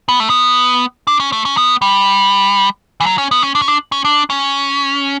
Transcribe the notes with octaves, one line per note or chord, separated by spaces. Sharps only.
B3
A3
B3
D4
C#4
A3
C#4
B3
G3
E3
F#3
C#4
B3
C#4
D4
C#4
D4
C#4
D4
C#4